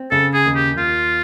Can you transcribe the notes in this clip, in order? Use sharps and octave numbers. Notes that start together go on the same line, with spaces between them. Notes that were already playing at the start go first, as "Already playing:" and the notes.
Already playing: C4
C#3 A4
G#4
D#2
G4
D#2 F4